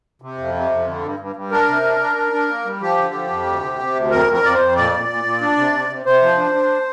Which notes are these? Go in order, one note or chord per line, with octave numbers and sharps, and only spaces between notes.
C3
F2
C3
F2
D3
G2
G2
G2
D4 A#4
C3
D4
D4
D4
D4
A#3
G3
F3 G4
D3
F3
F2
D2
C3
C3
D2
F2 A#4
F2
A#4
F2 D5
C5
F2
A#2 D5
A#2
A#2
A#2
D4
C3
C3
C3
C3 C5
F3
D4
D4